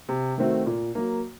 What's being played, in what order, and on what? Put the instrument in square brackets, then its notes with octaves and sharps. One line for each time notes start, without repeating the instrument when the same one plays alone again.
[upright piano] C3
D#3 A3 C4 F#4
A#2
F#3 A#3